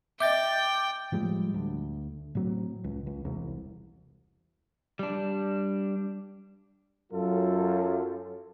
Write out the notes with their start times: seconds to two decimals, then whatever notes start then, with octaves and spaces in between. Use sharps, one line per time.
0.20 D#5 E5 G5 D6 G6 A6
1.12 A2 F3 G3 G#3
1.54 D2
2.35 A2 F#3 C4
2.84 C#2
3.07 C#2
3.25 E1 C2
4.99 G3 D4
7.12 F#2 F#3 F4 A4